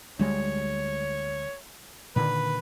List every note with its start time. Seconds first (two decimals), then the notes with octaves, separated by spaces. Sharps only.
0.19 D2 G3 G#3 C#5
2.16 A#2 D3 D#3 B4